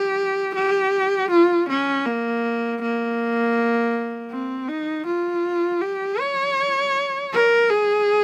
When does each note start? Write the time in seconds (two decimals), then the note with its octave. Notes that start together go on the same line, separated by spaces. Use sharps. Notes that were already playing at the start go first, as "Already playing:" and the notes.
Already playing: G4
0.55 G4
1.30 F4
1.69 C#4
2.06 A#3
2.81 A#3
4.31 C4
4.69 D#4
5.07 F4
5.82 G4
6.20 C#5
7.33 A#4
7.70 G#4